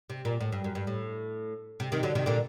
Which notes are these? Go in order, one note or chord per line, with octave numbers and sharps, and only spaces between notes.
C3
A#2
A2
G2
F#2
G2
A2
C3
C3 D#3
D3 F#3
C3 D#3
A#2 D3